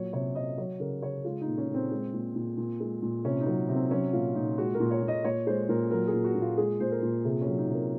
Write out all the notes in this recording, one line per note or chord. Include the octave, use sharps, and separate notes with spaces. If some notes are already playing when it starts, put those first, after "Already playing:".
Already playing: A#2 F#3 C#5
C3 C#5
C3 D#5
F#3 C#5
C#3 A#4
C#3 C#5
G#3 F4
D#4
A#2
C#4
A#2 C4
G#3
A#2
A#2
A#2
G#3
A#2
C3 C#4
D#4
F#3
C3
C4
F#3 C#4
A#2 F4
A#2 D#4
G#3 F#4
A#4
A#2
C#5
A#2
D#5
A#2 C#5
G#3 C5
A#2 A#4
F#3 A#4
G#4
A#2
F#4
A#2
F4
G#3 G#4
A#2 C5
A#4
A#2
C3 G#4
C#4
F#3
D#4
C3
A#4